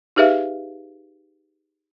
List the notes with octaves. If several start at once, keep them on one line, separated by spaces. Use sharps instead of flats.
D#4 G4 G#4 B4 E5 F5